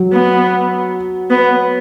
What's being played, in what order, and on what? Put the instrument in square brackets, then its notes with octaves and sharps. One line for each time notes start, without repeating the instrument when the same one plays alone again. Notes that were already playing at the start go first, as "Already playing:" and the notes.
Already playing: [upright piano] F#3
[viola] B3
B3